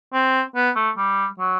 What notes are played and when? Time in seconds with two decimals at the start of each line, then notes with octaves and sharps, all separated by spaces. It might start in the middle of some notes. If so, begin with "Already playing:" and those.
0.14 C4
0.55 B3
0.76 A3
0.97 G3
1.39 F#3